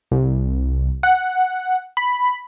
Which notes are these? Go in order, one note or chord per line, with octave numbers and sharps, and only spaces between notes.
C2
F#5
B5